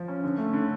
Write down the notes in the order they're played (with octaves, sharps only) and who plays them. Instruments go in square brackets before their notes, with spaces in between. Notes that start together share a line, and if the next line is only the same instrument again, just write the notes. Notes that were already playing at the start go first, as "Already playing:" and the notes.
Already playing: [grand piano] F3
C#4
D3
A3
D3